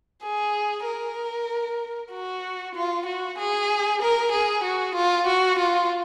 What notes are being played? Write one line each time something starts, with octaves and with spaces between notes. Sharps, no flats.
G#4
A#4
F#4
F4
F#4
G#4
A#4
G#4
F#4
F4
F#4
F4